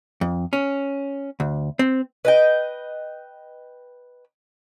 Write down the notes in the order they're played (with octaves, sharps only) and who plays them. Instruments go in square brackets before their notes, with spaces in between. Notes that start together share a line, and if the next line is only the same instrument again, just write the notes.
[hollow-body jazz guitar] F2
C#4
D2
C4
[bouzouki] B4 D#5 G5